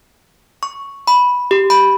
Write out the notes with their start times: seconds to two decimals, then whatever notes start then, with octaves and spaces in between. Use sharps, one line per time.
0.63 C#6
1.07 B5
1.51 G4
1.70 B5